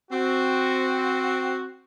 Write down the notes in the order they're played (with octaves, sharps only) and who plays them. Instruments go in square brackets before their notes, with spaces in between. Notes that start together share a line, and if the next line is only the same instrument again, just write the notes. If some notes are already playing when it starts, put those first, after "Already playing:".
[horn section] C4 F#4